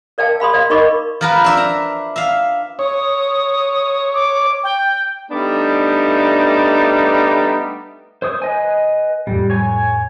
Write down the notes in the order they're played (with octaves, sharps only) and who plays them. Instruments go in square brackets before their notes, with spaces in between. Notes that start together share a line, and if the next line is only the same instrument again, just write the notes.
[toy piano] A#4 D5 F5 G5 A5
F5 B5 C6 D#6
D5 F5
D#4 A#4 D#5 B5 C#6 D6
[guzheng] F3 A#4 B4
D4 E5
A#5
E5 F5
[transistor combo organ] C#5 [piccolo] D#6
[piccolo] D6
G5
[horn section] G3 A3 B3 D4 D#4
[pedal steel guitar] C5 C#5 D#6
B4 D#5 G#5
[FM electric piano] F2 A2 [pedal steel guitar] G3
[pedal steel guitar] C#5 G#5